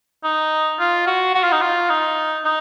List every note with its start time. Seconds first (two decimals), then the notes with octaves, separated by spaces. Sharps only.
0.24 D#4
0.79 F4
1.07 F#4
1.35 F#4
1.43 F4
1.52 D#4
1.61 F4
1.90 D#4
2.45 D#4